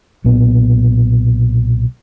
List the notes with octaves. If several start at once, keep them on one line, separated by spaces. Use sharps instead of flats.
B1 A#2 B3